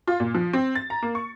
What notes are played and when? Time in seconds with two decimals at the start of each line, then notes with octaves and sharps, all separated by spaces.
0.08 F4
0.20 A#2
0.34 F3
0.53 C4
0.75 A6
0.90 A#5
1.02 A#3
1.15 C#6